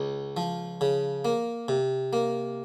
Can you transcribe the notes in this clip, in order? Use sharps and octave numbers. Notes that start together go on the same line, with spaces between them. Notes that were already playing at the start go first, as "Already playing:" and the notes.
Already playing: C#2
F3
C#3
A#3
C3
A#3